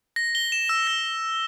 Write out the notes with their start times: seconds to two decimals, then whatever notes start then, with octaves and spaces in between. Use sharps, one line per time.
0.16 A#6
0.35 G7
0.52 E7
0.69 E6
0.87 A#6